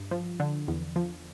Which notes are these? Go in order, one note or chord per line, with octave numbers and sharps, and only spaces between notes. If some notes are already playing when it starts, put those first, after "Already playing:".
Already playing: G2
F3
D3
E2
F3